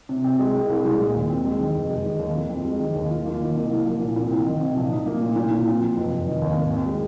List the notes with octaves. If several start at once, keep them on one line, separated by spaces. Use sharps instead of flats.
C3
C4
G#3
C2
C2
G#3
A#2
D#2
C4
G#3
D#3
F1
G#3
D#3
D#2
F2
C4
G#3
D#3
D#2
F4
A#3
D#3
C2
A#3
F3
A#2
C2
C4
D#3
C3
A#1
D#4
A#3
A#2
A#2
A#2
C4
F3
F1
F1
D#3
D#2
G#1
C4
G#3